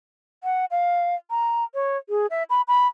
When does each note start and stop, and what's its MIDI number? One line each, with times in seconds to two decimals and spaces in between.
0.44 0.65 78
0.71 1.15 77
1.30 1.64 82
1.74 1.97 73
2.09 2.27 68
2.31 2.43 76
2.50 2.62 83
2.68 2.87 83